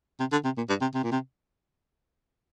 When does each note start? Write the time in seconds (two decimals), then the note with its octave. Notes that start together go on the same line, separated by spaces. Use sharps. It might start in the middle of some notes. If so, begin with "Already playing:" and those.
0.19 C3
0.32 D3
0.44 C3
0.57 A#2
0.69 G2
0.81 C3
0.94 C3
1.03 A#2
1.12 C3